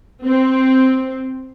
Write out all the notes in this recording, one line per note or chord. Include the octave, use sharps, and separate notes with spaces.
C4